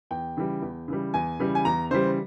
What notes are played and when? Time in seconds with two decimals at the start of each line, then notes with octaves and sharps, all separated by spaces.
0.11 E2 G5
0.37 C#3 E3 G3
0.62 E2
0.88 C#3 E3 G3
1.14 E2 G#5
1.40 C#3 E3 G3
1.55 G#5
1.65 E2 A#5
1.91 C#3 E3 G3 C5